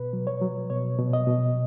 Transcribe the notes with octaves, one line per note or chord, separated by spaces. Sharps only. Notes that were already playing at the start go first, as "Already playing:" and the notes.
Already playing: B2 B4
F#3
C#5
F#3
B2 C#5
B2
D#5
B2